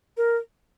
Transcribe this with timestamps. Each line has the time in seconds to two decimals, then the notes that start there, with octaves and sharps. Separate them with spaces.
0.17 A#4